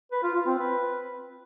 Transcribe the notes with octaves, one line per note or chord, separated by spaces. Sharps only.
B4
F4
F4
C4
B4